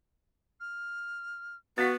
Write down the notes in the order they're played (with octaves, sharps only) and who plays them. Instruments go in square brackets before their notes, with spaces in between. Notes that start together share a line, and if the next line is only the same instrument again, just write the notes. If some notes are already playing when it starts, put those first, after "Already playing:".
[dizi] F6
[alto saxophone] B3 [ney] F#4 [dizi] F5 [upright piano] A6 B6